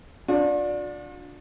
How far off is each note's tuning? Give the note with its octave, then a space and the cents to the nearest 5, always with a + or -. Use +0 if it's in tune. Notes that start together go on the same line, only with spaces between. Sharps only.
D4 +0 F4 +45